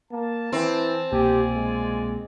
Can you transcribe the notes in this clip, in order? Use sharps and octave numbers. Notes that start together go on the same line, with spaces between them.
A#3 A5
E3 C4
C2 B2 A#3 F4 G4 D5 G#5
G#3